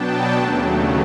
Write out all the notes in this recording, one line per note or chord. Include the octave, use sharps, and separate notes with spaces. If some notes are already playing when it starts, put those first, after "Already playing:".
Already playing: B2 F#3 B3 D4 G5 A5
D#2 C#3 F#3 A3